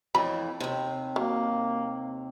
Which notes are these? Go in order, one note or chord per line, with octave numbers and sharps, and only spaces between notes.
F2 A2 E3 B5
D#2 C3
F#3 A#3